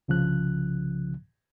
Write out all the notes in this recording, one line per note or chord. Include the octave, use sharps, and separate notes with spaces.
C2 C#3 F3 F#6